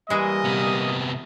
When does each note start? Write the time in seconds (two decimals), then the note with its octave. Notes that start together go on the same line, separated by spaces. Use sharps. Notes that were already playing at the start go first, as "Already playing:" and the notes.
0.10 E3 G3 G#3 A#3 D#5
0.45 C3 B3